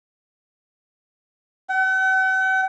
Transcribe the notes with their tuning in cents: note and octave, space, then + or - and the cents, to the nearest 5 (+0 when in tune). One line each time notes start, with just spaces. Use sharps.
F#5 +45